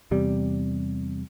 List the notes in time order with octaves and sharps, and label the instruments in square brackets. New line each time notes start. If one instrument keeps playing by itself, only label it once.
[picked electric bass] E2 C3 G3